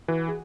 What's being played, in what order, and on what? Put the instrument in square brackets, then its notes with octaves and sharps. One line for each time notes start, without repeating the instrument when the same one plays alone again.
[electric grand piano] E3 [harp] F#4
[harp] G#4